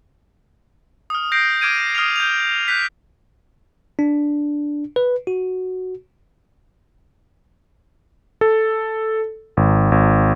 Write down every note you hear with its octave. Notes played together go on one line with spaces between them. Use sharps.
D#6 F6
G6 A#6 C7 D7
D6 F6 G#6 D7 D#7
D#6 F6 C7 D7 F7
G6 F7
F#6 G6 B6
D4
B4
F#4
A4
G#1
G#1